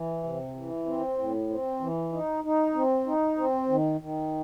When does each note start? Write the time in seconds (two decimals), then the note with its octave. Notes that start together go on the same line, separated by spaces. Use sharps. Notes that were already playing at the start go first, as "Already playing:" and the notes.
Already playing: E3
0.23 C3
0.55 E3
0.86 C4
1.17 A2
1.49 C4
1.80 E3
2.12 D#4
2.44 D#4
2.75 C4
3.06 D#4
3.38 C4
3.69 D#3
4.01 D#3